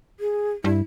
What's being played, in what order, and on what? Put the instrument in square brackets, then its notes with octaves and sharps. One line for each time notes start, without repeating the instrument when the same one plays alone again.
[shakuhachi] G#4
[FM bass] G2 [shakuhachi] E4